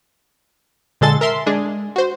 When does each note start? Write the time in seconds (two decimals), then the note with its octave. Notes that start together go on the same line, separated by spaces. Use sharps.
1.01 A#2 D3 G#3 A4 C6 A6
1.21 A#4 E5 C6
1.46 G#3 D4 G#4
1.96 F#4 C5